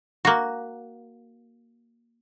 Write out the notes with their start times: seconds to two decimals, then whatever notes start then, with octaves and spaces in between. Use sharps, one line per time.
0.25 A#3 F#4